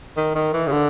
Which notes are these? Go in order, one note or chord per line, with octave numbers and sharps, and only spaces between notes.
D#3
D#3
E3
C#3
D3